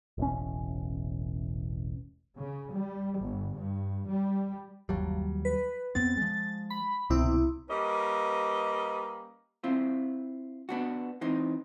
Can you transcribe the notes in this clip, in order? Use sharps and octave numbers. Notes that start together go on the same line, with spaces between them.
E1 A1 C#4
C#3
G3
G1
G2
G3
G1 D#2 F#3 G3
B4
F2 B3 C4 A6
F3 G#3
B5
D1 C2 B2 C4 E4
G3 A#3 C#4 B4 D#5
C4 E4 F4
B3 D4 F#4
E3 C4 D#4